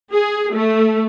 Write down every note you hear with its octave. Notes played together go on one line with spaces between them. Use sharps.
G#4
A3